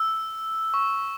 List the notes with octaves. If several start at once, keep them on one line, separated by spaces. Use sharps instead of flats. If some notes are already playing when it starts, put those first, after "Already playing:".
Already playing: E6
C#6